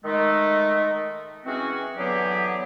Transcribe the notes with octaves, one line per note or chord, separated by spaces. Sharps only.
D#3 G#3 A3
E3 G#3 C4 C#4 F#4
D3 E3 F#3 B3 G4 G#4